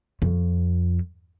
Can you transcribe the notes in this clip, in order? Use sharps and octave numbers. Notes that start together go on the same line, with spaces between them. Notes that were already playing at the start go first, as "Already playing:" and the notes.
F2